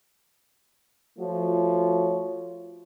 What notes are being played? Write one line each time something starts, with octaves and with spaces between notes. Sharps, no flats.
F3 A3 F4 F#4 C#5